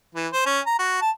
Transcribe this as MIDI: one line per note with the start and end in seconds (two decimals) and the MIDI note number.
0.15 0.27 52
0.33 0.42 72
0.46 0.60 61
0.66 0.79 82
0.79 0.98 66
1.01 1.10 81